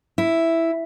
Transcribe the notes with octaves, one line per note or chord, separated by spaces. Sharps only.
E4